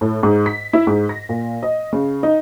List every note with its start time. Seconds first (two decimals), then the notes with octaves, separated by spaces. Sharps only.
0.01 A2
0.23 G#2
0.46 B6
0.73 E4
0.87 G#2
1.09 A#6
1.29 A#2
1.63 D#5
1.93 C#3
2.23 D#4